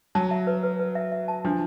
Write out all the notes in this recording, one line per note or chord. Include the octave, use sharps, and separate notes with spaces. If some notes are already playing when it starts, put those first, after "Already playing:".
F#3 A5
E5
B4
B4
B4
E5
E5
A5
F3 D4